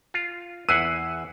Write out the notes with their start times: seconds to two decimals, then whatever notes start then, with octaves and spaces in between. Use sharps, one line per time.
0.14 F4
0.69 E2 E4 F#5 E6 F#6 C7 D#7